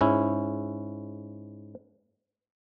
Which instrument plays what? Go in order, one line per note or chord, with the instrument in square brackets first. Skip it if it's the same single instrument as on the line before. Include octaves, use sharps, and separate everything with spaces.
[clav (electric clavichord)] G#2 C#4 E4